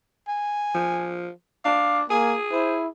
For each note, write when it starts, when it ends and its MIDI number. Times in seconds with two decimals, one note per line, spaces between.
0.28 1.11 80
0.74 1.30 53
1.65 2.04 62
1.65 2.00 77
1.65 2.04 86
2.10 2.37 58
2.10 2.87 68
2.10 2.36 80
2.52 2.88 64
2.52 2.77 72